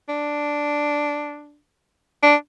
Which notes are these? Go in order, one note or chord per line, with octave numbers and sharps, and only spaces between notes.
D4
D4